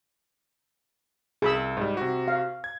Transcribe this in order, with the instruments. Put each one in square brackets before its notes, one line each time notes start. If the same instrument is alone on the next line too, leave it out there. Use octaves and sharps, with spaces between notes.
[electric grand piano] C2 [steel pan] G#4 B5 E6
[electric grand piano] G#2 G3
C3 F#4
[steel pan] F5
[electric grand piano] G#6